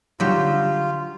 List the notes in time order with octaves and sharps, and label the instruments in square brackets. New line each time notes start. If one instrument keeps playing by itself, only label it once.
[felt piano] D3 G3 [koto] F#3 G4 [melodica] F4